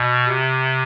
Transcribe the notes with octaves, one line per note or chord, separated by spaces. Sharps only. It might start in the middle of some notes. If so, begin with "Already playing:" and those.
Already playing: B2
C3